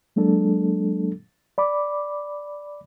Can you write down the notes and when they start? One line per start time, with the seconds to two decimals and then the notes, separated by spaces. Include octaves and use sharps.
0.16 F#3 G#3 A#3 D4 A4
1.58 D5 B5 D6